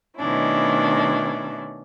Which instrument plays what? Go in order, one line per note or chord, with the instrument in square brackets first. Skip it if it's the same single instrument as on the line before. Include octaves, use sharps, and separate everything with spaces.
[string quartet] B2 D#3 A3 C#4 D4 E4